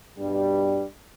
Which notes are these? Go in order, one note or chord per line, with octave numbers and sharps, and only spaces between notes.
G2 B2 G3